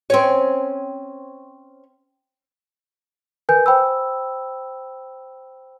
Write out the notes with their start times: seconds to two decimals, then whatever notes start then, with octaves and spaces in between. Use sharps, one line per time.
0.10 C4 C#4 C#5
3.49 A#4 B4 G#5 G6
3.66 C5 G5 B5 E6